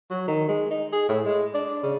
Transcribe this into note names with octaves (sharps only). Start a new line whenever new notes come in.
F#3
D#3
G#3
D#4
G#4
A2
G#3
D4
C#3